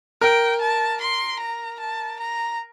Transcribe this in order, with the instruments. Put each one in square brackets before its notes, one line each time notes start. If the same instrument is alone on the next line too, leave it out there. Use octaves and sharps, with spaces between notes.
[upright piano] A#4 [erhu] G5
[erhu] A5
C6
A#5
A5
A#5